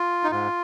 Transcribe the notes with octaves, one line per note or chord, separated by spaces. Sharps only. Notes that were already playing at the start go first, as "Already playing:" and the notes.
Already playing: F4
D#4
G#2 F4